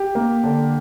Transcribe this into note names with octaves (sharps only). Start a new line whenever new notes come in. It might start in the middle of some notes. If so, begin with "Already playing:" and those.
Already playing: G4
A#3
D3